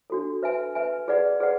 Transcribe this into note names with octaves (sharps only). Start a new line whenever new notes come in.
D4 F#4 A4
B4 E5 G#5
B4 E5 G#5
G#4 B4 D5 F#5
G#4 B4 D5 F#5